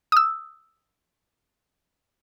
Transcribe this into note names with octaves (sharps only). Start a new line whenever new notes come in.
D#6 E6